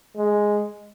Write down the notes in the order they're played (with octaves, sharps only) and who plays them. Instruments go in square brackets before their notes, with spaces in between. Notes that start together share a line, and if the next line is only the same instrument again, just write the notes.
[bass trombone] G#3